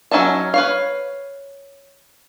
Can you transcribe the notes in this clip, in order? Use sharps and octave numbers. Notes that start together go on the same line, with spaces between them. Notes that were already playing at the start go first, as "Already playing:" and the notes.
F#3 C#4 D#4 E5 A5
B4 C#5 F5